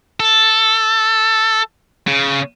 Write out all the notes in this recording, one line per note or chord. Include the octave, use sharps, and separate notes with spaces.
A4
C#3